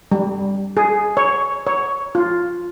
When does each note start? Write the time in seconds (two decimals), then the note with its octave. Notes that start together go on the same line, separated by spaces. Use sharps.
0.11 G3
0.77 G#4
1.17 C#5
1.67 C#5
2.15 F4